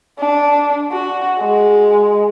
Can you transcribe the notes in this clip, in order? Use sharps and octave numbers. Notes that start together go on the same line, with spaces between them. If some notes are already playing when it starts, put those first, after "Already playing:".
D4
F#4
G#3